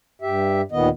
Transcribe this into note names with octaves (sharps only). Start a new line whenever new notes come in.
G2 G4 E5
D#2 A#2 D#3 B3 D#5